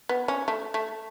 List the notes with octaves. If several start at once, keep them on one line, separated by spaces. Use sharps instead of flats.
B3
C#4
A3
A3